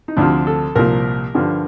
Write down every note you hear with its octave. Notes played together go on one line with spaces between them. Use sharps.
D#4
D2 C3 F3 D4
A4
C2 A#2 F3 A#4
G2 D3 F3